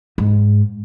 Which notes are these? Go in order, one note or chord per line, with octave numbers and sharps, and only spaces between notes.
G#2